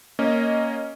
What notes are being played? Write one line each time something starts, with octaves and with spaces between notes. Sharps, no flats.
A#3 C#4 D#5